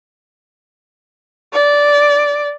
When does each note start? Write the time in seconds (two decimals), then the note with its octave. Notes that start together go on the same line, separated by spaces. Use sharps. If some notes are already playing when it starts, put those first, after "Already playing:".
1.53 D5